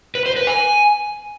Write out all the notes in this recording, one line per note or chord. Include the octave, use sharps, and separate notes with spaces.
B4
C5
B4
G#5